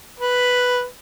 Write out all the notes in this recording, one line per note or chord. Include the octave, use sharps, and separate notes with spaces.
B4